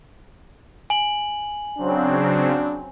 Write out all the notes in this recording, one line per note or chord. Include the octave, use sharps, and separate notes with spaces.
G#5 F#7
C#3 F#3 C4 D4